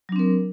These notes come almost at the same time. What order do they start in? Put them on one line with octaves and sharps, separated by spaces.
F#3 D4 C4 A#4